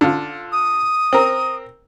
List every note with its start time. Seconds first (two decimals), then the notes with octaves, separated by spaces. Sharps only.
0.01 D3 F4
0.52 D#6
1.13 C4 A#4